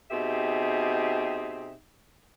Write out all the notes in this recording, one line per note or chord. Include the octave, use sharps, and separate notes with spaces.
B2 C4 D#4 G4 G#4 E5